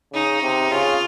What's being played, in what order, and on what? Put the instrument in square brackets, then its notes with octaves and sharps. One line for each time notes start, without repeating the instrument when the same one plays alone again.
[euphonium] C#3 [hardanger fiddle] D#4
[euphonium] C3
[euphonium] C#3 [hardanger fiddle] F4